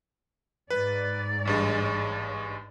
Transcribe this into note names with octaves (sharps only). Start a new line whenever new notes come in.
G#2 B4 D5
A1 G2 G#3